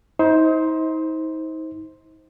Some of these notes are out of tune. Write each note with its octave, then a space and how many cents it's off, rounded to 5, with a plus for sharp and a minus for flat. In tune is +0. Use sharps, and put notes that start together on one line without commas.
D#4 +40 C5 +0